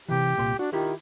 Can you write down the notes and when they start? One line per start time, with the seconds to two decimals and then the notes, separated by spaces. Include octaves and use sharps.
0.09 C3 E3 G4
0.37 C2 A#2 C6
0.59 D4 F#4
0.73 D#3 E4 F4 G4